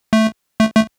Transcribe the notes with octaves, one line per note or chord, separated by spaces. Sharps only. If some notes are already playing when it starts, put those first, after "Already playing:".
A3
A3
A3